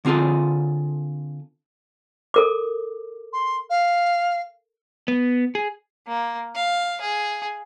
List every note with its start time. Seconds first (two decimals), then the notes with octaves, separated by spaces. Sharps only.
0.05 D3 C4 F4 G#4 A4
2.34 A4 A#4 D6
3.33 C6
3.70 F5
5.08 B3
5.55 G#4
6.08 A#3
6.55 F5
7.01 G#4